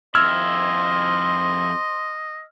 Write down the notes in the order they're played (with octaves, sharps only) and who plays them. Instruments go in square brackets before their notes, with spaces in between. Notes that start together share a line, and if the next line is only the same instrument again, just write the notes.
[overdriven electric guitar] F2 E4 [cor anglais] C5 [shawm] D#5 [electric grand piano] E6 F6 G#6